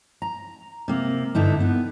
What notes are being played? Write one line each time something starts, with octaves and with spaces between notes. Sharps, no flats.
A#5
C3 A#3
G2 D3 D#4 E4
B3